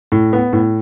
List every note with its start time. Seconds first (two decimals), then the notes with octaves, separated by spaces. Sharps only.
0.12 A2
0.33 B3
0.53 A2